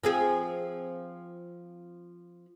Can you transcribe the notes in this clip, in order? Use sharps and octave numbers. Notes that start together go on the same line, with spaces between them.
F3 C4 G#4